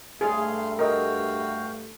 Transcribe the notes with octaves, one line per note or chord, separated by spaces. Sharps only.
G2 A3 G#4 F5 C6
F#4 A#4 D#5 F5 G5